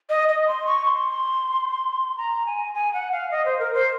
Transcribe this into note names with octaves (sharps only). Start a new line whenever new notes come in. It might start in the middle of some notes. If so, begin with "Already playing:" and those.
D#5
D#5
C6
C#6
C6
A#5
G#5
G#5
F#5
F5
D#5
C5
A#4
C5